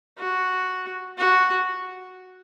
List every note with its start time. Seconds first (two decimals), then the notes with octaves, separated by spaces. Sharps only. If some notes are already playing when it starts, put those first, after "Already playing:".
0.18 F#4
1.18 F#4